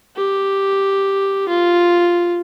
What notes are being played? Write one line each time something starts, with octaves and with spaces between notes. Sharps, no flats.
G4
F4